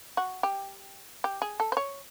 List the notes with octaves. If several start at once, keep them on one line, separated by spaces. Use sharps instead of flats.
F#4
G4
G4
G#4
A4
C5
C#5